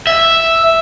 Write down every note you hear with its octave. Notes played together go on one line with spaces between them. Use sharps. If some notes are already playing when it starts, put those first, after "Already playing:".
E5